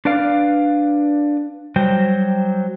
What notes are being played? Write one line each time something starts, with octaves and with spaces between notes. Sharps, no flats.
D4 B4 D5 F5
F#3 G3 C5 G5